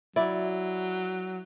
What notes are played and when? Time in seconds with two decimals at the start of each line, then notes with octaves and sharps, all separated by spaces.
0.16 F#3 E4 D5